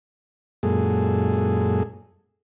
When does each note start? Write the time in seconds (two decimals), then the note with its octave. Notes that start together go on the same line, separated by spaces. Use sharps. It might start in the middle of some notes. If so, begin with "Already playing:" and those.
0.63 F#2 A#2 G#3 G#4 A4